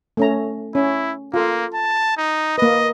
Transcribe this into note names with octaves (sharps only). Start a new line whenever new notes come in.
A3 C#4 A#5
C#4 E4
A#3 F4 A4
A5
D#4
A#3 B4 D#5